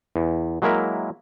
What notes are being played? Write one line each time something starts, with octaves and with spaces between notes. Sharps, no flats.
E2
F#3 G#3 A#3 E4 A#4 E5